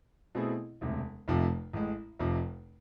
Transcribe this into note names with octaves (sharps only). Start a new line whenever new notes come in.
B2 A3 C4 E4 G#4
E1 D2 C3
F1 F2 C3 F3 A3
A1 A2 G#3
F1 F2 C3